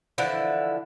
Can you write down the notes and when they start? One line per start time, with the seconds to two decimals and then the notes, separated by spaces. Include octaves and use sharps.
0.18 D3 E3 F3 E4